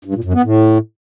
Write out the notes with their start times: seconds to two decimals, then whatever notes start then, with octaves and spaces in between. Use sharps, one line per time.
0.05 G2
0.14 A#2
0.24 F#2
0.34 B3
0.43 A2